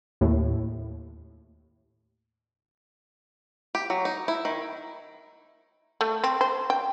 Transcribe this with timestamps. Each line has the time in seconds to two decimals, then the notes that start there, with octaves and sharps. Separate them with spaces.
0.21 D#2 A2
3.75 G4
3.90 F#3
4.05 D#4
4.28 E4
4.45 D#3
6.01 A3
6.24 C4
6.41 C5
6.70 G5